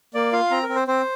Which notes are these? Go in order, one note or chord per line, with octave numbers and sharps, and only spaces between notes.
A#3 D5
F4 F5
C4 A#5
A#4
C4
C5
C4 C5